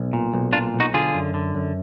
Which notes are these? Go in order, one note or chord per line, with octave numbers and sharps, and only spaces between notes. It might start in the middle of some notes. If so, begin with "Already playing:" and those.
Already playing: B1
A#2
B1
A#2 D4 F4
B1
D#4 F#4
D3 F4 G#4
F#2
D3
F#2